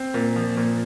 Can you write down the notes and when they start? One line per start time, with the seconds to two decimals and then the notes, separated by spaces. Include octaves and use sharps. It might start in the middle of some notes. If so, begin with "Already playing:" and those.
Already playing: C4
0.14 A#2
0.36 F3
0.57 A#2